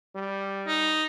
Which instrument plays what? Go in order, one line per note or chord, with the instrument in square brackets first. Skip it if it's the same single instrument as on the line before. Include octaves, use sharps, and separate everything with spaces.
[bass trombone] G3
[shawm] D#4